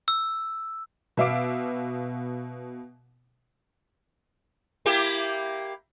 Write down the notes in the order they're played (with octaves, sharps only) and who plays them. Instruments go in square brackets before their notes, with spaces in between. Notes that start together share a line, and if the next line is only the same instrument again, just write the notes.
[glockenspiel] E6
[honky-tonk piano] B2 B3 E5 F5 D6 D7
[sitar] A#3 E4 G4